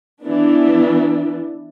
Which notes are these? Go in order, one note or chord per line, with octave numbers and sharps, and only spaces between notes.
E3 B3 D4